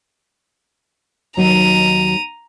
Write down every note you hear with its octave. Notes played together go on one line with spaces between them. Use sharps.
D#2 F#3 D#4 A#5 D#7